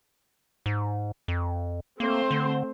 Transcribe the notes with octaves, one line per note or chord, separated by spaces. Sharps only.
G#2
F2
A3 A#3 C4 C5
D3